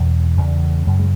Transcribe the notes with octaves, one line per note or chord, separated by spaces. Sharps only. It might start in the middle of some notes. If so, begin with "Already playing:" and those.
Already playing: E2 B2
E2 C#3
F#2 C#3
G#3